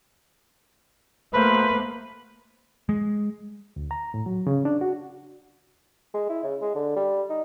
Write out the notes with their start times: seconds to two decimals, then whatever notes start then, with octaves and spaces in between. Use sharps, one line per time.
1.33 B2 A3 A#3 B4 C5
2.89 G#3
3.76 D2
3.91 A#5
4.14 A2
4.26 F#3
4.47 C#3
4.65 D4
4.81 F#4
6.14 G#3
6.29 E4
6.44 C#3
6.61 G#3
6.75 D3
6.96 G3
7.30 D#4